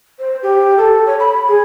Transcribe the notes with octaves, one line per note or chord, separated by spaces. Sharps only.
C5
G4
A4
C#5
B5
G#4